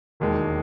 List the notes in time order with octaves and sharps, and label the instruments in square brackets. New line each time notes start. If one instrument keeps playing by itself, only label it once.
[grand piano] E1 D#2 D#3 G#3